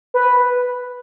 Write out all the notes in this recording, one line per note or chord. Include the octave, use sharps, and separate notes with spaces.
B4